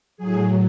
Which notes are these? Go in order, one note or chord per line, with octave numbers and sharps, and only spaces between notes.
A2 F#3 G#4